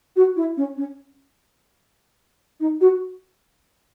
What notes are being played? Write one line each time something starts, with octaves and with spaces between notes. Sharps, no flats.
F#4
E4
C#4
C#4
D#4
F#4